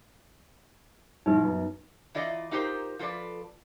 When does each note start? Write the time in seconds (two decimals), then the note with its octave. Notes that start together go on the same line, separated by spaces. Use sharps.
1.26 A#1 E3 F3 D#4 B4
1.44 F#2 B3
2.15 E3 F4 D5 D#5 A#5
2.51 D#4 F4 G4 A#4 C5
2.99 F3 F4 A4 B4 D5